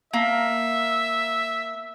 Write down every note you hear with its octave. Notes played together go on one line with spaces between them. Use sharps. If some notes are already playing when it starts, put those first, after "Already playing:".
A#3 E5